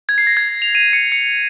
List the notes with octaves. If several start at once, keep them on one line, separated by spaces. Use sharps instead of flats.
G#6
C7
A#6
G#6
F7
D#7
C#7
C#7